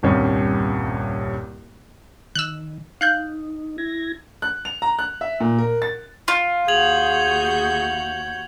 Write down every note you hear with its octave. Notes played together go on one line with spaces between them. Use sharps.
D#1 C2 G2 G3 C#4
D#3 E6 F#6
D#4 F5 F#6 G6
E4 G#6 A#6
F#6
F7
A#5
F#6
E5
A#2
A#4
A6
F4
D#2 F#4 G#4 G6 G#6 F7 F#7